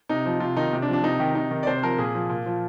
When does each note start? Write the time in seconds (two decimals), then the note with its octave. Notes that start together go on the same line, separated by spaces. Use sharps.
0.09 C3 D#4
0.26 F3
0.40 C3 F4
0.56 D#3 D#4
0.73 C3
0.82 D4
0.88 F3
0.93 D4
1.04 C3 D#4
1.20 D#3 G4
1.35 C3 D#4
1.51 D#3
1.63 D5
1.67 C3 C5
1.83 F3 A#4
1.98 A#2 G#4
2.15 F3
2.29 A#2
2.46 F3